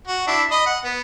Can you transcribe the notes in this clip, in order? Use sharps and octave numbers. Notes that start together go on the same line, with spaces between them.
F#4
D4 E4
D#5 B5 D#6
F#5
B3